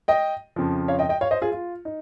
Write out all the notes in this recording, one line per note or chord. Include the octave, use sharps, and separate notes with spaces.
D#5 G5
F2 C#3 F3
C#5 F5
D#5 G5
D#5 G5
C#5 F5
C5 D#5
F4 G#4
F4
D#4